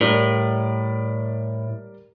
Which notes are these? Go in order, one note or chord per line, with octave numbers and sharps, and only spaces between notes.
A2 G3 A#4 D5